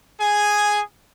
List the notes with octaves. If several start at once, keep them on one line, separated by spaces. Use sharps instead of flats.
G#4 G#5